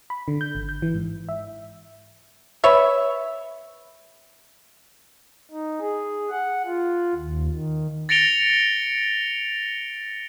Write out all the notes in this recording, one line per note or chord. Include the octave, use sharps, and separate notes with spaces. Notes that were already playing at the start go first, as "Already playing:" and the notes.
B5
D3
G6
G#1
G6
E3
G#2
E5
B4 C#5 E5
D#4
G#4
F#5
F4
D#2
D#3
A6 A#6 C#7 D7 F7 G7